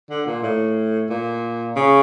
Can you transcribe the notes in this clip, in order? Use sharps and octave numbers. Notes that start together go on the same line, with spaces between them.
D3
A#2
A2
A#2
C#3